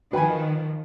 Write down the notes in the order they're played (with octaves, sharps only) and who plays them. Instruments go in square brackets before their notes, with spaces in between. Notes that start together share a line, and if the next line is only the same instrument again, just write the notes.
[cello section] D#3 F3 [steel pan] F#4 G5 B5 [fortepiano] B4 G#5